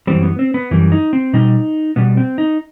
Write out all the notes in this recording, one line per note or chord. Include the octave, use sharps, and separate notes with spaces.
F#2 E3 G3 C4
B3
C4
B3
F#2 E3 G3
D#4
C4
B2 G3 D#4
B2 G3 B3
C4
D#4